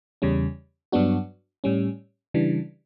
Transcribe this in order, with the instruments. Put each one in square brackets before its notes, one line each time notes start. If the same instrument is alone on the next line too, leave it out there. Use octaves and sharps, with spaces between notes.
[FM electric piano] E2 C#3 G3 C#4
G2 F#3 B3 D4 F#4
A2 G3 C#4
C#3 E3 G3 D4